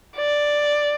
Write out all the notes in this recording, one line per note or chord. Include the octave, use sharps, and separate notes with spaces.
D5